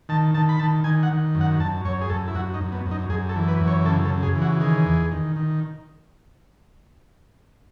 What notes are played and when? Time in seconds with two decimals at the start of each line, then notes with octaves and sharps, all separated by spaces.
0.09 D#3 A5
0.34 D#3 A5
0.49 B5
0.59 D#3 A5
0.84 D#3 G#5
1.03 F#5
1.10 D#3
1.35 F#2
1.41 F#5
1.60 F#2 A5
1.85 F#2 C#5
2.01 G#4
2.10 F#2 A4
2.28 E4
2.35 F#2 F#4
2.54 D#4
2.61 F#2
2.72 B3
2.86 F#2
2.91 D#4
3.10 F#2 G#4
3.29 A4
3.35 E3
3.48 B4
3.61 F#2
3.67 C#5
3.85 C#3 A4
4.05 A4
4.10 C#3
4.23 G#4
4.35 E3
4.42 F#4
4.60 D#3 G#4
4.85 E2
5.11 D#3
5.36 D#3